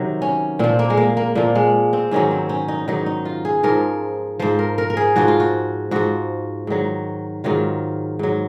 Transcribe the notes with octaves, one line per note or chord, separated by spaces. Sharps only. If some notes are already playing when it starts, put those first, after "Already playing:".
Already playing: C3 D#3 F#3
C#4
A#2 F3 C4
A#3
G#3
A#3
A#3
A#2 F3 A#3
G#3
C4
G#2 D#3 F#3 C#4
C4
C#4
D#4
G#2 D#3 F#3 D#4
D#4
F4
G#4
G#2 F3 A#4
G#2 F3 C5
A#4
A#4
A#4
G#4
G#2 F3 F#4
F4
F#4
G#2 F3 F#4
G#2 D#3 F#3
G#2 D#3 F#3 F4
G#2 F#3